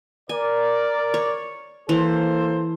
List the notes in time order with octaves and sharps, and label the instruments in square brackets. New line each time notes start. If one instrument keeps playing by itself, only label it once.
[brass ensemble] A#4 D5 [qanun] G#5
[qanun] C#5
[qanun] E3 [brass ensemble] A#3 A4 C5